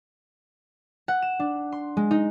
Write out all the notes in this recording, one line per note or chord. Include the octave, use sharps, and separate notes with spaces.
F#5
E7
D4
C6
G#3
D#4